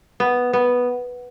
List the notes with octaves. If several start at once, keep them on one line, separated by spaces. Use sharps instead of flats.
B3
B3